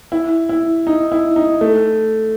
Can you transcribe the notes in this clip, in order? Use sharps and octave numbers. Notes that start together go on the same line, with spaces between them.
E4
E4
D#4
E4
D#4
A3